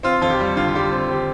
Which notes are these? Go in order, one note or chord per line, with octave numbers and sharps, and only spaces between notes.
C4 F4
F2 F4
G4
G3
D3 F4
F4
G3 G4
C4
G4